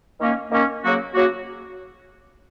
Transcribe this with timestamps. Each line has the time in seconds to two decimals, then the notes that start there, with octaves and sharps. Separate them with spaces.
0.20 D#3 A#3 C#4
0.51 D#3 A#3 C#4
0.83 C#3 F#3 A#3 F#4
1.14 C#3 F#3 A#3 F#4